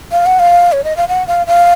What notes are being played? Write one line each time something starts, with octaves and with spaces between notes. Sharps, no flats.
F5
F#5
F5
C#5
D#5
F5
F#5
F5
F5